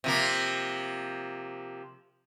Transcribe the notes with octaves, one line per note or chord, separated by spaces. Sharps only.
C3 F3 A#3